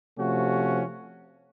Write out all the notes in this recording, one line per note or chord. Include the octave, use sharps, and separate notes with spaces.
C3 F3 A3 C#4 F#4